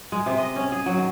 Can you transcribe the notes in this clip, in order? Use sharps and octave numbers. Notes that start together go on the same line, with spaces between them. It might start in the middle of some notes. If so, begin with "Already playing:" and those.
G#3
C3
D#5
C#4
G#4
F#3
D#3